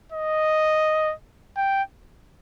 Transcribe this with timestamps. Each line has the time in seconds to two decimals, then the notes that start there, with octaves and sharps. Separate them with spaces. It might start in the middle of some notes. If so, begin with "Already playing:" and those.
0.12 D#5
1.57 G5